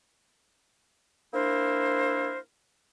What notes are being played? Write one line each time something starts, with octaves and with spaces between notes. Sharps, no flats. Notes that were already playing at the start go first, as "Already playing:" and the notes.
A#3 D4 E4 A#4 C5